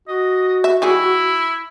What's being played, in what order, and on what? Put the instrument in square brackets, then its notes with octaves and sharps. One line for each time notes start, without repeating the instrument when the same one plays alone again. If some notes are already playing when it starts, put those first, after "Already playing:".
[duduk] F#4 [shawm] D#5
[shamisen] E5
[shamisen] D#3 G3 G#4 [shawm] E4